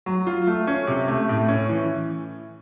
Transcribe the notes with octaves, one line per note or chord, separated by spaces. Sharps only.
F#3
F4
A3
C#4
C3
A3
A2
C#4
E3